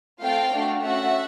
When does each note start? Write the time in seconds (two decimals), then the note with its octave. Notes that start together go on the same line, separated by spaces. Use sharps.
0.22 A3 C4 F4 A4 F5 G5
0.52 A3 D4 F#4 A4
0.82 A3 C#4 F#4 A4 E5 F#5